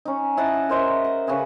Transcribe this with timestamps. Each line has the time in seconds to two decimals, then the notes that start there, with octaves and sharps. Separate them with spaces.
0.05 C#4 D#4
0.37 E4 D#5 F#5 A5
0.69 A#4 C5 D#5 E5
1.04 F#5
1.27 C#3 F#4 G#4 B4